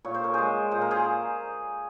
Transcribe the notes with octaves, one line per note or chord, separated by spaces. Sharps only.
A#2 C#5
C5
A#4
G#3 G#4 C5
A#2 C5
A#4
G#4 C5